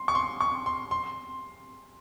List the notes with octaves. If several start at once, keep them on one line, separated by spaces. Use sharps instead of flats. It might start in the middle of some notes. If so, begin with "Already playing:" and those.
Already playing: C6
C#6
C6
C#6
C6
C6